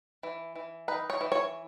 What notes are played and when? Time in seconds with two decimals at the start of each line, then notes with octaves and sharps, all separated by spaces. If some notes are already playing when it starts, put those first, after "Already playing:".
0.23 E3
0.56 E3
0.88 D#4 B4
1.10 C#5
1.21 E3
1.32 C#5